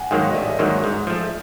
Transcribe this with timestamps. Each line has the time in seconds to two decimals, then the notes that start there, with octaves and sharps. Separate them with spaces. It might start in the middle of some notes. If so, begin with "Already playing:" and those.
Already playing: F#5 G#5
0.11 G#2 D#3 F#3 A#3 F5 G5
0.31 D#5
0.35 A1 D5 E5
0.59 G#2 D#3 F#3 A#3
0.84 G#2
1.07 F3 A3